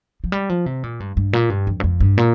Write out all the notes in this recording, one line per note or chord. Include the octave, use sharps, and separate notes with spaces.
F3
G3
F3
C3
A#2
G2
G2
A#2
G2
F2
G2
F2
G2
A#2